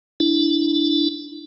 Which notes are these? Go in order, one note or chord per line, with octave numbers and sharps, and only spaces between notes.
D4 E4